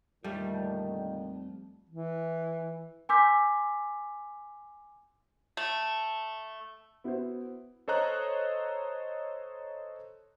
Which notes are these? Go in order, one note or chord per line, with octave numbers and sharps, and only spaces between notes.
F2 A#2 D3 D#3 G3 A3
E3
G#5 C6 D6 E6 G6 B6
A3
B3 E4 F#4 B4 C5
A4 C5 C#5 D#5 A#5 F#6